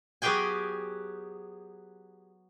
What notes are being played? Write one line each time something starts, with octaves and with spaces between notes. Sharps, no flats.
F#3 B3 G4 G#4 G5 G#5